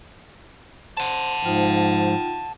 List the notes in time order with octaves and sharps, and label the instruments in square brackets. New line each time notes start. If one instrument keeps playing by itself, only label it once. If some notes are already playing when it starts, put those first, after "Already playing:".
[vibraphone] C5 C6 [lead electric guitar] F#5 A5
[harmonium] G#2 F3 [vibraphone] D#4 F4 G5